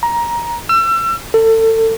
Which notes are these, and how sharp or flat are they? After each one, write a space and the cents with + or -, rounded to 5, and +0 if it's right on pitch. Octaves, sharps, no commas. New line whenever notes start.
A#5 +15
E6 +35
A4 +30